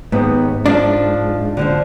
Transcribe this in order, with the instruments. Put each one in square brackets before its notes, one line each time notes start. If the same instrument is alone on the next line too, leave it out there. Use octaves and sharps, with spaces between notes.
[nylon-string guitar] D#2 B3 [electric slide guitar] G#2
[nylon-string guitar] F3 [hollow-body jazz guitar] D4
[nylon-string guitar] D3 E3 F3